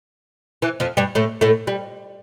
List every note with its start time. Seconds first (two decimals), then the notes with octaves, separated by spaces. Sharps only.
0.62 E3
0.80 F2 F3
0.97 G2 G3
1.15 A2 A3
1.41 A2 A3
1.67 G3